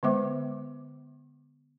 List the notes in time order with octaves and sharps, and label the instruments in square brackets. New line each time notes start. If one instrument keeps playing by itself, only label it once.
[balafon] D3 G#3 B3 C5 E5 D6